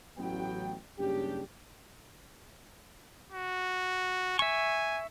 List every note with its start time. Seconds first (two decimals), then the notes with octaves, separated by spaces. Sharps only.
0.17 A1 F#3 B3 G5
0.98 F#1 G2 C#3 D4 G4
3.32 F#4
4.39 E5 G#5 C#6